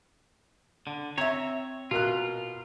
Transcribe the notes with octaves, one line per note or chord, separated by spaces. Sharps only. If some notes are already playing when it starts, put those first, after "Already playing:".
D3
C4 C#5 E5 A#5
B2 F4 A#4 F#6